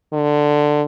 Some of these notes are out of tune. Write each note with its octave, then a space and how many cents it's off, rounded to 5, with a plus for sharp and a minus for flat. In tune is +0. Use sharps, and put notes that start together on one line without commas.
D3 +10